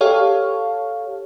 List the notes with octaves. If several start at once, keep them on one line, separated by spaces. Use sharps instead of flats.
G4 A4 C#5 F5